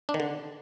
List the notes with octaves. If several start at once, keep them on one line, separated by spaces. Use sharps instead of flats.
D4
D#3
D3